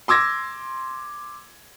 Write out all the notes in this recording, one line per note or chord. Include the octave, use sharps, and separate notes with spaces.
C6 D6 E6 G#6 A#6